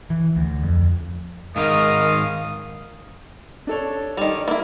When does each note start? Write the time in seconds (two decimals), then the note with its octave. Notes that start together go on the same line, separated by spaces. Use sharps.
0.10 E3
0.36 D2
0.63 F2
1.56 G#2 D#3 A#4 D#5 F5 D#6
3.67 D4 A4 C#5
4.17 D#3 G3
4.48 A#3 E4